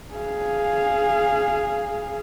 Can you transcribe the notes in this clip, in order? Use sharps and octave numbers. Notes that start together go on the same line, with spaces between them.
G#4 F5